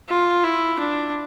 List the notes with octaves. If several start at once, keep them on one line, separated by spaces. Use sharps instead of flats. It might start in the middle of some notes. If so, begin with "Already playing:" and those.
F4
E4
D4